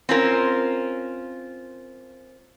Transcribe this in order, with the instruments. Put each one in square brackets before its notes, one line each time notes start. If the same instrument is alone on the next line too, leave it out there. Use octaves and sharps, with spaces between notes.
[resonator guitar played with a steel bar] C4 C#4 F4 A#4